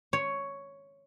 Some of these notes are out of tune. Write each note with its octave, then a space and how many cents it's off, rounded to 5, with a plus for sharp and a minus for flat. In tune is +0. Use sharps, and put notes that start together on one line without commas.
C#5 +5